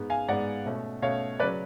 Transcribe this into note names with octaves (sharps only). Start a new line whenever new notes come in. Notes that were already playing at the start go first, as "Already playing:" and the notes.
Already playing: G#2 G#3 B3
F5 G#5
G#2 G#3 B3 D5 F#5
B2 A3 C#4
B2 A3 C#4 C#5 F5
C#3 F#3 C#4 B4 D5